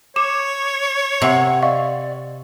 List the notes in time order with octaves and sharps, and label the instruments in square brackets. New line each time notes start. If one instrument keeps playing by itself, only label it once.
[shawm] C#5 [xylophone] D6 E7
[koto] C3 [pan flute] F#5
[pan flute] D5 [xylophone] D#5 F5 C#6